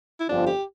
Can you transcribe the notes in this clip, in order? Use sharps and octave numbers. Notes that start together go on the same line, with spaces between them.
E4
G1 F2 D3 F3 D4
G4